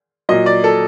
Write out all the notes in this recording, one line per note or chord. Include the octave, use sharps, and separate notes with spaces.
A#2 F#3 D#5
D5
A4